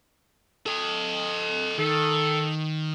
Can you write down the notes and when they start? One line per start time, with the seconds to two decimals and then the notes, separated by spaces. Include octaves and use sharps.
0.66 A4 D#5
1.78 D#3 A4